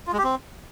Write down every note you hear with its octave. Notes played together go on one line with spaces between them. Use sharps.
F4
G#3
G4
C4